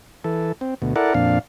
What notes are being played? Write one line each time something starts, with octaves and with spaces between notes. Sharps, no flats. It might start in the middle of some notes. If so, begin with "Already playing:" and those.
E3 A4
C4
D2 B2
E4 A4 A#4 D5 F#5
F2 A#2 D4 F5